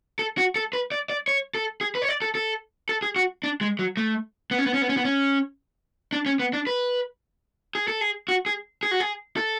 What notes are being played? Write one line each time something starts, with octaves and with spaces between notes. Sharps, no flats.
A4
F#4
A4
B4
D5
D5
C#5
A4
G#4
B4
C#5
D5
A4
A4
A4
G#4
F#4
D4
G#3
F#3
A3
B3
C#4
B3
C#4
B3
C#4
B3
C#4
D4
C#4
B3
D4
B4
G#4
A4
G#4
F#4
G#4
G#4
F#4
G#4
A4